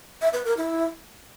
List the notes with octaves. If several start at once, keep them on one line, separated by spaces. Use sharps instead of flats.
E5
B4
A#4
E4